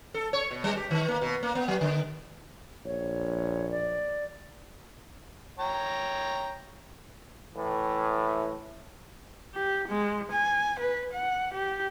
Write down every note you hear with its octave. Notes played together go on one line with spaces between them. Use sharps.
A4
C#5
B2
G3
G4
D#3
A#3
B2
A#3
B3
F#3
D3
A#1 C#5
D5
C#5 G5 A#5
A2 E3
G4
G#3
G#5
B4
F#5
G4